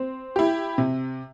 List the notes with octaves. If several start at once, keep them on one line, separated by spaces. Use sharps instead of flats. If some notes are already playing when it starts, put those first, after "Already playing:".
Already playing: C4
E4 G4
C3